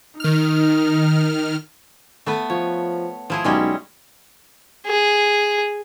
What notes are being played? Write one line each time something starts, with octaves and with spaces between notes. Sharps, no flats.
D#3 D#4 F6
A3 B3 B4
F3 C#5
F3 E4 G#4
B1 G3 G#3 C#4
G#4